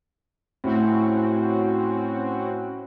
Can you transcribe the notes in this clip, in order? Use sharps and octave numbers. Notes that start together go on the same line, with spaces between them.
A2 C4 C#4 F#4